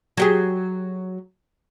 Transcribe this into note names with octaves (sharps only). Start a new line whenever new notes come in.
F#3 G4 G#4